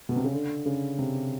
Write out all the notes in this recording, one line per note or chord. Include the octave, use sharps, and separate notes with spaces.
B2
C3
C#3
D3
C#3
C3